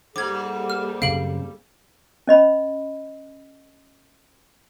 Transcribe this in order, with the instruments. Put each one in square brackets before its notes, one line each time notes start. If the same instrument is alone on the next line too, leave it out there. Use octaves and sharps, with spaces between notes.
[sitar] G#2 [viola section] G3 A#3 A4 [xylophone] D6 G#6
[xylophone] F6
[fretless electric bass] F#2 C#3 C4 [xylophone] F5 D7 F#7
[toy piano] C#4 D#5 B5